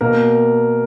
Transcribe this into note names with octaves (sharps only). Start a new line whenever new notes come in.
B2 A#3 A#4